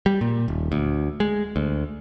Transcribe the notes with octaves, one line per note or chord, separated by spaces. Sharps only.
G3
A#2
D#1
D2
G#3
D2